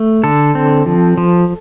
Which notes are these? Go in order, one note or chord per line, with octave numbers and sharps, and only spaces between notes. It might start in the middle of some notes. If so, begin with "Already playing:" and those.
Already playing: A3
D3 A4
C4
F3
F3